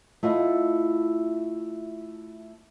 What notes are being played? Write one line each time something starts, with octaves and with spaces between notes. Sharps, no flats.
A3 E4 F4 D#5